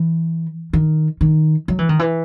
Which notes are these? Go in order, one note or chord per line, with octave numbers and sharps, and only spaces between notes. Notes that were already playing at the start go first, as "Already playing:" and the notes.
Already playing: E3
D#3
D#3
F#3
E3
D#3
E3